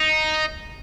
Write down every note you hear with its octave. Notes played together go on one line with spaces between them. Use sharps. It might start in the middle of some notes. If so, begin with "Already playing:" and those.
Already playing: D#4